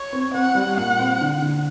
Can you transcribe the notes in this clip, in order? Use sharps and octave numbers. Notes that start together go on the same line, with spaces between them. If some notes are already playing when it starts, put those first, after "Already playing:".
Already playing: C#5
C4
C4 F#5
G3
A#2 F#5
C4
D3
D3